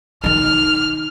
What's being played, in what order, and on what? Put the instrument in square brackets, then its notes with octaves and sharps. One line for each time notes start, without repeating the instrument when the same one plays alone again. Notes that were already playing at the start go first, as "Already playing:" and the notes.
[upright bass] D#3 D#4 [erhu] F6